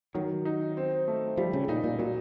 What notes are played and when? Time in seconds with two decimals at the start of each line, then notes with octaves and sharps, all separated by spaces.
0.14 D#3 F#3
0.45 D#4
0.77 C4
1.08 A3
1.37 F3 G3
1.53 C#3
1.68 A#2 D#4
1.84 A#2
1.99 A#2 F#3